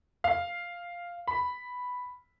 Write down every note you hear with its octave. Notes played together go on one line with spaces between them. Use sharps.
F5
B5